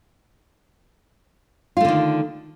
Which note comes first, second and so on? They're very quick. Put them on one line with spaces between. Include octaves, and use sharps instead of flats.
F4 A3 D3 D#3